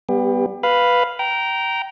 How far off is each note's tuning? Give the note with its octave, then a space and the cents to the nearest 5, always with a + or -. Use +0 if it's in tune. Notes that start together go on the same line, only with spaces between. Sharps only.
G3 +0 B3 +0 G4 +30
B4 +0 F5 +0 B5 +0
G5 -20 A#5 +5